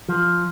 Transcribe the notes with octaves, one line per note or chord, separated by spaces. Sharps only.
F3